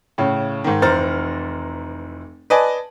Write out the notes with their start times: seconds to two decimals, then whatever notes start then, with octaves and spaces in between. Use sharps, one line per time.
0.18 A2 C#3
0.64 G#2 D#3
0.82 F1 E3 C5 A#5 F6 A6
2.50 B4 D5 D#5 G#5 A5